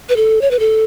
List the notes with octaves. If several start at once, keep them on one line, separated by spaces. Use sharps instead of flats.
B4
A4
C#5
B4
A4